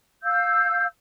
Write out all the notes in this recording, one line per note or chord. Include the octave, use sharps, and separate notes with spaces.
F5 E6 G6